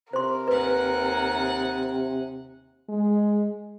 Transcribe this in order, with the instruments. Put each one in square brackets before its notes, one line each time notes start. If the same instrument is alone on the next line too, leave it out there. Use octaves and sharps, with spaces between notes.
[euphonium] C3 [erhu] A#4 [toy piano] C5 C6
[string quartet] D#2 F#5 G#5 [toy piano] B4
[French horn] G#3